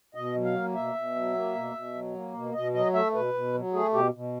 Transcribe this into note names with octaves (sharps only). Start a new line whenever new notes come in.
B2 D#5
F#3
F5
A#3
B2 E5
B2
F#3
A#3
B2
B2
F#3
A#3
B2
B2 D#5
F#3 D#5
A3 E5
B2 B4
B2
F#3
A3 G#4
B2 G4
B2